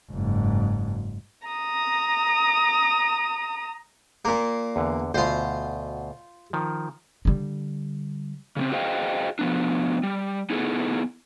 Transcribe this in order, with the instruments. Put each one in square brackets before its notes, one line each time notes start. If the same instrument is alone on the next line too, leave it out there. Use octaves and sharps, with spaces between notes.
[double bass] F#1 G#2
[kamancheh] A#5 D#6
[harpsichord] A#2 A#3
[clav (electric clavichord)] E2 D3
[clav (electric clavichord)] D2 B2 [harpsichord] F4 C5
[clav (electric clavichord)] D#3 F3
[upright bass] D3 G3
[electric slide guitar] C#3 A#3 C4
F#4 G#4 C5 D#5 F5 G5
F3 B3 D4
G3
B3 D#4 E4 G#4 A4